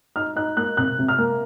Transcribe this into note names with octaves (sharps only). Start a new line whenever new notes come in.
D#4 F6
D#4 F#6
A#3 F#6
C3 F#6
C3
F6
A#3